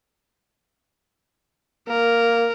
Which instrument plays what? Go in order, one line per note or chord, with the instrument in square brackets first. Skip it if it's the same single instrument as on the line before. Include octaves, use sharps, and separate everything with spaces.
[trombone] A#3 [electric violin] A#4